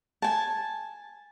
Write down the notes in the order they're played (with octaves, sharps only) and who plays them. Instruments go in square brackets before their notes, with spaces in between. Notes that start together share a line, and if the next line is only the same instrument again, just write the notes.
[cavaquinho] G#5 A5